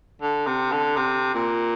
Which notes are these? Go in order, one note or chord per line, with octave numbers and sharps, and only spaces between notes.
D3
C3
D3
C3
A#2